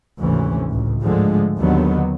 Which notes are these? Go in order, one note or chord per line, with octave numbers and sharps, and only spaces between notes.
G#1 D2 C3 E3 C#4
C#2 A2
G#2 D3 F3 G#3 A3
D#2 D3 D#3 F#3 B3